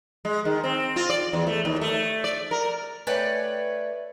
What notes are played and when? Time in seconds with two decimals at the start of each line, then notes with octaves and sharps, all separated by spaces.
0.25 G#3
0.45 D#3
0.63 C4
0.96 F4
1.10 D5
1.33 E2
1.47 A3
1.65 D#2
1.81 A3
2.24 D5
2.51 A#4
3.07 A3 B4 C#5 D5 G5